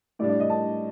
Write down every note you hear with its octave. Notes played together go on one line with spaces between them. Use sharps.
A2 G3 D4 D5
D5
D#5
A5